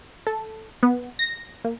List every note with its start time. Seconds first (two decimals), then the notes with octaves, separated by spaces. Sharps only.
0.27 A4
0.83 B3
1.19 A#6
1.64 A#3